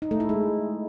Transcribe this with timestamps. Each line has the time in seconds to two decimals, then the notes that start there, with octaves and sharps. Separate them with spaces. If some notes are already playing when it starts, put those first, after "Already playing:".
0.02 D#4
0.11 A3
0.20 E4
0.29 G#3